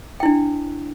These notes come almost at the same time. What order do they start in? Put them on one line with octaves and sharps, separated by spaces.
G5 E4 D4